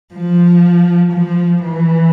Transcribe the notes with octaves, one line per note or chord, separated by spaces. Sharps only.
F3
F3
E3